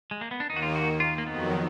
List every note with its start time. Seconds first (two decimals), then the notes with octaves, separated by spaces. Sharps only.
0.11 G#3
0.21 A#3
0.31 B3
0.40 D4
0.49 D#2 D#3 A#3 D#4
0.56 F#4
0.63 F4
0.76 F#4
1.00 F4
1.18 A#3
1.26 F2 D#3 F#3 B3